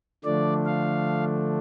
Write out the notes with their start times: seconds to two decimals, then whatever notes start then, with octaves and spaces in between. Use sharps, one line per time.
0.24 D3 F3 A3 D4 D5
0.66 F5